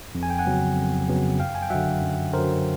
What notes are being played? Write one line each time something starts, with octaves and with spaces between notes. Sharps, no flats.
F2
G#5
G5
F#5 G#5
C#3 F#3 B3
F2
C#3 F#3 B3
F#2 F5 G5
G#5
G5
D3 F#3 E5 F#5
F#2
D3 F#3 A#4 C5